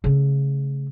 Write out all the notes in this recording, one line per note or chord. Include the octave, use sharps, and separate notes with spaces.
C#3 A3